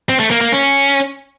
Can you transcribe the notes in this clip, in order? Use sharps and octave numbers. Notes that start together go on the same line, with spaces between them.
C4
A3
A#3
A#3
C#4